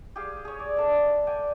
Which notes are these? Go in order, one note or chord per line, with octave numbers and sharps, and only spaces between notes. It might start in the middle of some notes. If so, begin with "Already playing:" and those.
G4 G#4 F5
G#4 C#5
D5
D4 A4 E5
D5 G5 G#5